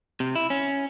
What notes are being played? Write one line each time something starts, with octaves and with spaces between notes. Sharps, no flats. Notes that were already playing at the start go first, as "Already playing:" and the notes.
C3
E4
C#4